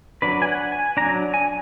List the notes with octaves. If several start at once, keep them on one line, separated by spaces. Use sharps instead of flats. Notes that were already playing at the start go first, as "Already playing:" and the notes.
F#3 D4 B4
G#5
F#5
G#5
F#3 D4 A#5
G#5